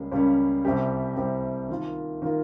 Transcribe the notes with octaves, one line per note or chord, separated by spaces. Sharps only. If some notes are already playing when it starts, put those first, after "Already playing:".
Already playing: C#2 C#3 G3 A#3 C#4
C#2 C#3 G3 A#3 C#4
C2 C3 G3 C4 G4
C2 C3 G3 C4 G4
D#3 A#3 F4
D#3 A#3 F4